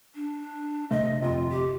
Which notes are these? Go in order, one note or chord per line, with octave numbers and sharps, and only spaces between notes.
D4
G#1 C3 A3 D#5
G1 F2 C3 F4
G4